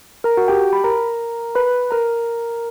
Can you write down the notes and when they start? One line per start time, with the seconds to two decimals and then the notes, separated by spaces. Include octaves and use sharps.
0.24 A#4 A#5
0.37 F#4 F#5
0.48 G4 G5
0.73 B5
0.84 A#4 A#5
1.55 B4 B5
1.91 A#4 A#5